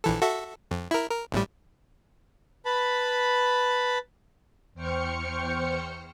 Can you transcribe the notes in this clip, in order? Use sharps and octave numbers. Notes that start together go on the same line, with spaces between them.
A#1 E3 A4
F#4 A4 E5
F2
E4 A#4
A#4
G#1 A2 G3
B4 A5 B5
E2 C5 G5 C#6 F6 C#7